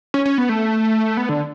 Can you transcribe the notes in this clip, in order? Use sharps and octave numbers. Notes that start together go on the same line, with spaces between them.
C#4
C#4
B3
A3
B3
D3